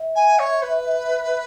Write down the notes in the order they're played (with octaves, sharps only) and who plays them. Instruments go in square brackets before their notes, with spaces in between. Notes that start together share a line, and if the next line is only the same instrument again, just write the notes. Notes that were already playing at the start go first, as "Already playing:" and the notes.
Already playing: [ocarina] E5
[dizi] G#5
C#5
B4